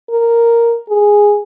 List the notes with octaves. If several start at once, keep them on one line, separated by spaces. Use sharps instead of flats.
A#4
G#4